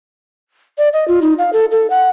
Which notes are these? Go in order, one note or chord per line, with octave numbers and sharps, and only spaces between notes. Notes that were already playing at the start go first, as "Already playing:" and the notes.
D5
D#5
F4
D#4
F5
A4
A4
F#5